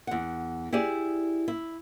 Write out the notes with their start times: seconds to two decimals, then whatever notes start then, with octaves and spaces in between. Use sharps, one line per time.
0.07 E2 F#5
0.73 E4 G4 G#4 D5
1.48 E4